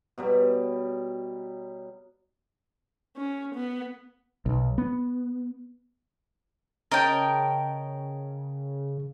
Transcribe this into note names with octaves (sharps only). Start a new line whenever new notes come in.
B2 F#3 G3
C#4
B3
B1
B3
C#3 A#4 C#5 D#5 G5 A5